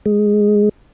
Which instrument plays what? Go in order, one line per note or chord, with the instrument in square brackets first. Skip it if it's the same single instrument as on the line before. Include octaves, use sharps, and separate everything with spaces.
[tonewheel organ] G#3